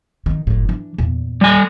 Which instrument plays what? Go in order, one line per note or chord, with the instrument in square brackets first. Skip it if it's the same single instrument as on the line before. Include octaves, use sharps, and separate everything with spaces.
[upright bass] F2 D#3
F#1 A2
E3 D4
E2 A#2
[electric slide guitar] G3 G#5